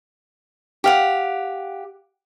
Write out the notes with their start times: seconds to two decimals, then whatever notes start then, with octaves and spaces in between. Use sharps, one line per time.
0.84 G4 F5 F#5